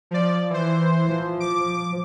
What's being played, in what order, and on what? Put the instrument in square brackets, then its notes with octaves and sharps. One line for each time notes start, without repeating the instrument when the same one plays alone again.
[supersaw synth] F3 D5
E3 C5
[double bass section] F3
[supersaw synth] D6